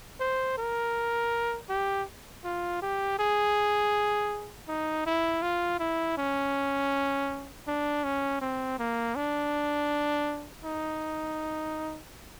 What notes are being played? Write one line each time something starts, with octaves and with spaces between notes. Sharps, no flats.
C5
A#4
G4
F4
G4
G#4
D#4
E4
F4
E4
C#4
D4
C#4
C4
A#3
D4
D#4